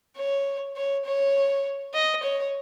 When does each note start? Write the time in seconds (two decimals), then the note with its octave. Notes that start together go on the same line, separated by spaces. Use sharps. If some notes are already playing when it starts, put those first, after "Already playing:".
0.17 C#5
0.77 C#5
1.05 C#5
1.94 D#5
2.23 C#5